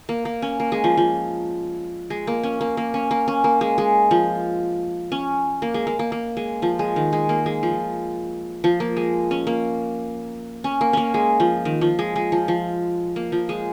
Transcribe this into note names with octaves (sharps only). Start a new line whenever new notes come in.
A#3
A#3
C#4
A#3
G#3
F3
F3
G#3
A#3
C#4
A#3
A#3
C#4
A#3
C#4
A#3
G#3
G#3
F3
C#4
A#3
G#3
A#3
A#3
A#3
G#3
F3
G#3
D#3
G#3
A#3
G#3
F3
F3
A#3
G#3
C#4
A#3
C#4
A#3
A#3 C#4
G#3
F3
D#3
F3
G#3
G#3
F3
F3
A#3
F3
G#3